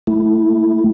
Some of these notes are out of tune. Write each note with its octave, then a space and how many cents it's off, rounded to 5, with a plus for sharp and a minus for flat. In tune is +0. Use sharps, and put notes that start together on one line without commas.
A3 +0 E4 +0